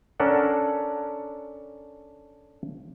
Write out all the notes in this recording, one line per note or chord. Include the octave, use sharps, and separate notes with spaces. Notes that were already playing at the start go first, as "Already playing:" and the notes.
C#4 D4 A4 A#4 F#5